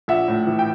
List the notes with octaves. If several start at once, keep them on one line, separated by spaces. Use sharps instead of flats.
A#1 E5 F#5
A2
E3
G5